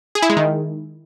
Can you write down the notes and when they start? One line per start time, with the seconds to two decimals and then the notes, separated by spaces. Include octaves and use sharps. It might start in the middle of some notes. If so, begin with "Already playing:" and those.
0.15 G#4
0.22 E4
0.30 G#3
0.37 D#3